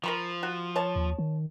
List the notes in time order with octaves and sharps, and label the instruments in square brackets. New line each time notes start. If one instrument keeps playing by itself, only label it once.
[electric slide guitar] F3 [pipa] A#4 B5 C#6
[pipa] F#4
C#5 A5
[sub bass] D#2
D#3